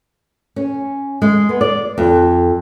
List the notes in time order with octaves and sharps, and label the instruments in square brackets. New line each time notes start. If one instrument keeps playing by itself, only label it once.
[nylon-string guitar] C#4
G#3
B3
D5
F2